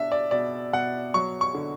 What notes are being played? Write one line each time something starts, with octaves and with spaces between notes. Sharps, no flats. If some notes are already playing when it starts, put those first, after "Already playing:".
Already playing: B2 D4 E5
D5
B2 D5
B2 F#5
F#3 C#6
C#6
D3